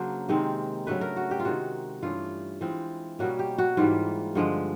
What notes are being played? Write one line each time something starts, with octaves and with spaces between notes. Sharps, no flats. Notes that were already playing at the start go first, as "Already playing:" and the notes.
Already playing: C#3 F#3 A#3 D4 C5
C3 D#3 G#3 C4
C#3 F#3 A3 D4 B4
A#4
F#4
G4
F4
C3 D#3 G#3 F#4
G2 E3 A3 C#4 F4
E3 G#3 C4 F4
B2 G3 A#3 C#4 F#4
G4
F#4
G#2 E3 G3 A#3 F4
G2 D3 F3 G#3